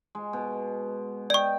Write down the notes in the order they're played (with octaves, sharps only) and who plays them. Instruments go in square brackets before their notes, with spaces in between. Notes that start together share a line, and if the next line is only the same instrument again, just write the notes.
[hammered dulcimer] G#3
B2
[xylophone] D5 C#6 [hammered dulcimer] D#5 G5